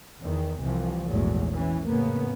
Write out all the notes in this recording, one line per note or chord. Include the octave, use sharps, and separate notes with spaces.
E2 D#3
C2 C3 E3 F3
A#1 E2 G#2 F#3 A3
E3 C#4
F2 A2 C#3 A#3 B3